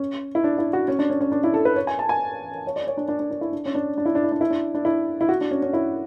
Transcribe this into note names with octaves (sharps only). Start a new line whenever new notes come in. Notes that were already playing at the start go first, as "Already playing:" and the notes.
Already playing: C#4
E4
D4
E4
F#4
C#4
D4
C#4
C#4
D4
E4
A4
B4
C#5
G#5
A5
G#5
C#5
D5
C#5
D4
D4
D4
D4
E4
D4
C#4
D4
D4
E4
D4
E4
D4
E4
D4
D4
E4
E4
F#4
D4
C#4
C#4
E4